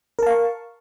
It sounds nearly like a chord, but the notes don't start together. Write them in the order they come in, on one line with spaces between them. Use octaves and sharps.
A#4 A5 F5 C#6